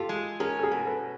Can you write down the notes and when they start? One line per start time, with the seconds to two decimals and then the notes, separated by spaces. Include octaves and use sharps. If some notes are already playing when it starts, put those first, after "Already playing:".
Already playing: F4 G4 A4
0.09 G#3
0.40 C#4 G#4 A#4
0.59 A4
0.63 G#4 A#4
0.72 B2
0.87 A4 B4